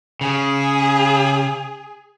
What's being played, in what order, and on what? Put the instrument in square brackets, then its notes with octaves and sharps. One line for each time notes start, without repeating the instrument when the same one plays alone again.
[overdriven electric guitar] C#3 [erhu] G#4